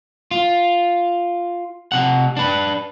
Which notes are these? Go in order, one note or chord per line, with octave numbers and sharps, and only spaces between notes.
F4
C3 F#5
D4 B4